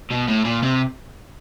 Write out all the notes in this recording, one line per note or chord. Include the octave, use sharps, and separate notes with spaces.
B2
A2
A#2
C3